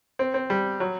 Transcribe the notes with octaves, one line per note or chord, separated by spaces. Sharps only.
C4
C4
G3
F#3